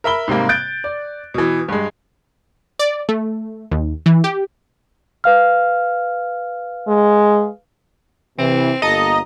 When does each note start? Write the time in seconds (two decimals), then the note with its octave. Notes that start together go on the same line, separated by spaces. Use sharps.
0.04 A#4 E5 B5 G7
0.28 G#2 C3 G3 A#3
0.49 F#6 G6 A6 D7
0.84 D5
1.34 B2 E3
1.68 G2 G#3
2.79 D5
3.09 A3
3.71 D#2
4.06 E3
4.24 G4
5.24 B4 F5 F6
6.88 G#3
8.38 C3 E3 C4
8.82 G1 A#3 A4 D#5 A#5